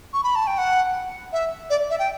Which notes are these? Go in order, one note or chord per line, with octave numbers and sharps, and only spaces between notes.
C#6
B5
A5
G5
F#5
E5
D5
E5
G5